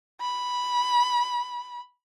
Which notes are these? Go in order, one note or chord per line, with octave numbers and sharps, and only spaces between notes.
B5